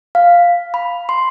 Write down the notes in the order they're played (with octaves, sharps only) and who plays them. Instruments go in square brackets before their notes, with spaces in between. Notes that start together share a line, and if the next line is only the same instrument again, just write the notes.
[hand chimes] F5
B5
C6